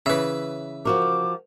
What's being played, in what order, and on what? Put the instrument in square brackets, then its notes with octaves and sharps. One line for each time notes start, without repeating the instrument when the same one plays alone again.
[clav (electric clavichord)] C#3 E3 [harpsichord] B4 E5
[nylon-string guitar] F3 F#4 A#4 [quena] D6